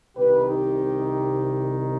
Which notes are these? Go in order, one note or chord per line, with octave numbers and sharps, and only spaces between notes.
C2 C3 D#3 G4 B4
D#4 G4